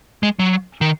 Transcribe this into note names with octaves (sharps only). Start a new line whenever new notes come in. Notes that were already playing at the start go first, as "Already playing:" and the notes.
G#3
F#3
D#3